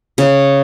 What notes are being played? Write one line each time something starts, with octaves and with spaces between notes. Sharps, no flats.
C#3